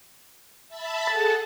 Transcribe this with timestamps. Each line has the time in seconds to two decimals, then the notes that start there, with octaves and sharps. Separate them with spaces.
0.68 E5 A5 B5
1.07 G#4 A4 F#5 A5